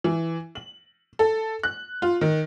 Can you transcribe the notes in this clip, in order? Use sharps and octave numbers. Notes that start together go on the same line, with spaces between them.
E3
F#7
A4
F#6
F4
D#3